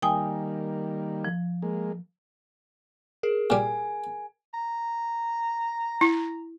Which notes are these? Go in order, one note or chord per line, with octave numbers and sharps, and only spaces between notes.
D#3 G3 A#3 G5 G#5 D#6
F3
G#3 A#3
G#4 A#4
A#2 G3 G#5
A#5
E4